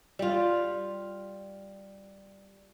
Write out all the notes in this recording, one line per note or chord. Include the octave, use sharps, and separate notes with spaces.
G3 F4